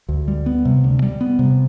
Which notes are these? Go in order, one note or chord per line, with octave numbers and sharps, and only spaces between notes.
D2
G3
B3
C3
D2
G3
B3
C3